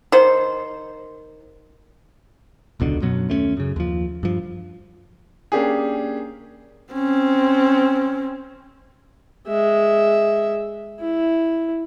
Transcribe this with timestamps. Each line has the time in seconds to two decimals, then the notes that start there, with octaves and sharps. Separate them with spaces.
0.12 D#3 C5
2.80 E1 C#2 B2 D3
3.01 F#2 B2 F#3 B3
3.29 D#2 A3 A#3 C#4
3.57 F#2 C#3
3.76 D#2 F3
4.23 G2 F3
5.52 A#3 C#4 D4 G4 G#4
6.92 C4 C#4
9.47 G#3 E5
11.00 E4